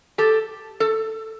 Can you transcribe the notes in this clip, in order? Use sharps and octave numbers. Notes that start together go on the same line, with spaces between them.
G4 A4
A4